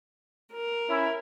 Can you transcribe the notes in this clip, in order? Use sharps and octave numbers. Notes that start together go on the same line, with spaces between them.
A#4
C#4 E4